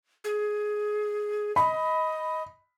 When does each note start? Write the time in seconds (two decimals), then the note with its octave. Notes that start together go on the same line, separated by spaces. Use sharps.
0.24 G#4
1.56 D#5 B5